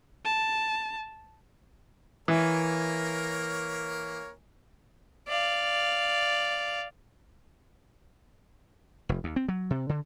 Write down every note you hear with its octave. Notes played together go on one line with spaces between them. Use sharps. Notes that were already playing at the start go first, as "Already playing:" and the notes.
A5
E3 A#3 A#4 C#5
D5 F5
F1
D#2
C4
F#3
C3
D3